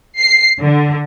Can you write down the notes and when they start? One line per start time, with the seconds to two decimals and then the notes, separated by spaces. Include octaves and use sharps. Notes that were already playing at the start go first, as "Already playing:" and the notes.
0.18 C7
0.59 D3